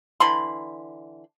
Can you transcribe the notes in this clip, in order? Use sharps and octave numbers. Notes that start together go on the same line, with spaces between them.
D3 E3 B5 C6